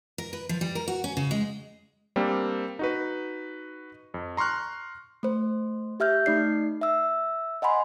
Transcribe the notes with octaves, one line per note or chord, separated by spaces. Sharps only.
A#4
B4
F3
G3
A#4
F#4
C#4
C#3
G#3
G3 A#3 C4 D4
D#4 F#4 B4
F2
A#5 C6 C#6 F6 F#6
A3 C5
G4 E5 F6 G6
A3 D#4 D5 C7
E5 E6
D#5 F#5 G#5 B5 C6